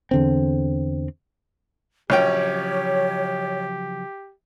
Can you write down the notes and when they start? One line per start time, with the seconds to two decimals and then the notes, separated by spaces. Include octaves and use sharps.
0.11 E2 D3 C4
2.10 A#1 C#3 F3 F#3 C#4 G4 C#5 G5